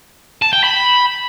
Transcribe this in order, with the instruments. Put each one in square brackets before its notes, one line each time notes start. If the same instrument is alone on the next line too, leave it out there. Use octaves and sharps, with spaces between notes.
[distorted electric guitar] A5
G5
B5